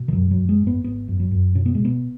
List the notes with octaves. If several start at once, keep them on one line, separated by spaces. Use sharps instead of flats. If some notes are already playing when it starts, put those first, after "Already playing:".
Already playing: B2
D#3
F#2 F#3
F#3
F#2
G#3
G#1
B3
G#1 B3
F#2
F#3
F#2
B2 C#4
B3
B2 G#3
B3